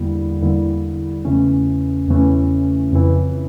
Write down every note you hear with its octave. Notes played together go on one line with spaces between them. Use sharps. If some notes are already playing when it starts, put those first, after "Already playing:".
Already playing: E2 D3 G3 A#3 E4
E2 D3 G3 A#3 E4
E2 C#3 E3 A3 C#4
E2 C#3 E3 A3 C#4
F2 C#3 E3